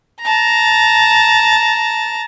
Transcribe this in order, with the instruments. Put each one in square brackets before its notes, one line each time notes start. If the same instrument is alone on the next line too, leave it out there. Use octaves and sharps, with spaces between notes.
[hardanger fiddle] A5 A#5